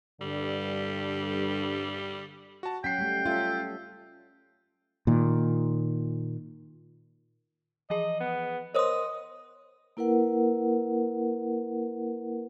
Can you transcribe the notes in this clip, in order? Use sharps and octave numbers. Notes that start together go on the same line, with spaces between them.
G2 D3 G3
F#4 A5
F#3 C#4 F#5 G5 B6 C7
G3 A3
C#4 F4 A4 E5
A#2 D#3
E3 F3 G#4 D#5
B3
A#4 C5 C#5 D#5 C6 D#6
A#3 E4 A#4 B4 F#5